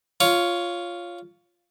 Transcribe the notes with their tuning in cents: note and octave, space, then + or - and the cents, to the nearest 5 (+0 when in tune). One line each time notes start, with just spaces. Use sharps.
F4 +0 C#5 +10